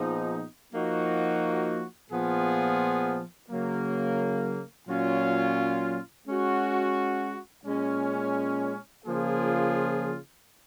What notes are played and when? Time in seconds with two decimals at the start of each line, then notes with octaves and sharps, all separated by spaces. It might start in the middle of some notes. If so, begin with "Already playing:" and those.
Already playing: A#2 F3 B3 D#4 G#4
0.73 F3 A#3 D#4 F#4
2.11 A#2 F3 B3 F4 G#4
3.50 C#3 F#3 A#3
4.88 A#2 F#3 C#4 F4
6.27 G#3 C#4 F#4
7.65 A#2 G#3 C#4
9.05 C#3 F3 A#3 F4 G#4